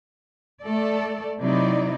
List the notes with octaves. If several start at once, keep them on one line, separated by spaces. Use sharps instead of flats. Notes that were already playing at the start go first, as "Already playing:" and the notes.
A3 A4 D5
C3 F#3 D#4 E4 D5